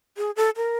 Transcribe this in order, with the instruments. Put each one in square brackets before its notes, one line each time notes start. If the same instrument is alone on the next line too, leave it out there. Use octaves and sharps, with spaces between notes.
[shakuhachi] G#4
A4
A#4